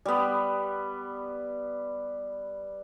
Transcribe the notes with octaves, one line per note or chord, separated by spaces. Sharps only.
G3 B3